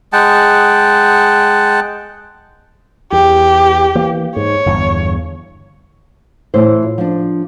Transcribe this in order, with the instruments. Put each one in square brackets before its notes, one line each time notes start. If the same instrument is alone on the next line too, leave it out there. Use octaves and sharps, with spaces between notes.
[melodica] G#3 F#5 G5 A5
[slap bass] E2 [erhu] G4
[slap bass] E3 A#3
[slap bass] G#2 [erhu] C#5
[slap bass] G1 E2
[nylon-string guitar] A2 E3 C5
F4
F3 D4